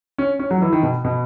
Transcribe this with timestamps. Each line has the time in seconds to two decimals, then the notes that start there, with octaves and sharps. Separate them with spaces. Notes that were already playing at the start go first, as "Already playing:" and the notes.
0.18 C#4
0.39 C#4
0.51 F#3
0.62 E3
0.72 D#3
0.83 B2
1.05 B2